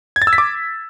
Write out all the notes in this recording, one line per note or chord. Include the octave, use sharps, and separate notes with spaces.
G#6
A6
E6
B6
D6